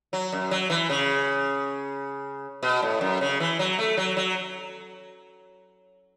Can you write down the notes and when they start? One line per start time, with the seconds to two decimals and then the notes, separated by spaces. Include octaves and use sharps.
0.13 F#3
0.32 F#2
0.51 F#3
0.70 E3
0.90 C#3
2.63 B2
2.82 A2
3.01 F#2
3.21 C#3
3.40 E3
3.59 F#3
3.79 A3
3.97 F#3
4.17 F#3